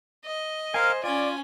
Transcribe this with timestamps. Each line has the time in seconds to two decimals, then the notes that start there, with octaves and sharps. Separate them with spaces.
0.25 D#5
0.74 A#4 C5 F5 G#5
1.04 C#4 F4 D5 G#5